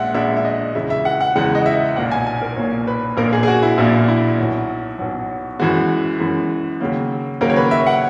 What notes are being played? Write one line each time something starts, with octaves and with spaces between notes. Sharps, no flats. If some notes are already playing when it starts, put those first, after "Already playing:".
Already playing: A#1 A#2 G#3 E5 F#5
A#1 A#2 G#3 E5
E5
D#5
E2 C#3 G#3 E5
E5
F#5
F#5
E2 C#3 G#3 F#5
D#5
E5
B1 A#2 A#3 F#5
G#5
G#5
A#4
B1 A#2 A#3 C#5
B4
A#1 A#2 A#3 A#4
G#4
G#4
F#4
E4
A#1 A#2 A#3 E4
E4
B1 B2 F#3
B1 B2 F#3
F#2 E3 G#3 F#4
F#2 E3 G#3
D#2 C#3 F#3 A#3
D#2 C#3 F#3 A#3 A#4
C#5
B4
E5
F#5